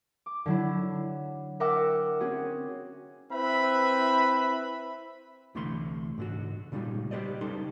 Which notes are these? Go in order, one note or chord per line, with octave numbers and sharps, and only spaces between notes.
D6
D3 F#3 E4
A#4 E5 F#5 G5 D6 E6
C4 C#4 F#4 G#4
C4 E4 B4 E5 B5
C2 D3 E3 A3 B5 C6
G#2 D3 F#4
A#2 C#3 G3 G#3 D#4 F#4
G4 B4 C5 D5 D#5
B1 C#3 G3 D#4 A4 C6